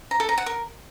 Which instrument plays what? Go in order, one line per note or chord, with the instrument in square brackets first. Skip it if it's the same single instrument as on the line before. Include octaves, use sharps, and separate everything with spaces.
[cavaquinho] A#5
A4
A#5
F#5
A#4